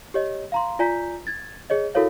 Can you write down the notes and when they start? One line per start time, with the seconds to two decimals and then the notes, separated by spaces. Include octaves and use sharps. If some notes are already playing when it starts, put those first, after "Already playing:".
0.14 G4 C#5 D#5
0.52 F5 A#5 C6
0.79 F4 D5 G#5 A#5 G6 B6
1.27 G#6 A6
1.70 G#4 C#5 D#5
1.95 E4 F#4 A4 A#4 C#5 F5